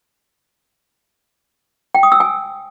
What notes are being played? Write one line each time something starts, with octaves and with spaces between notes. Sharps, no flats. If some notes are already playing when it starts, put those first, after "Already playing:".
G5
D#6
E6
G#5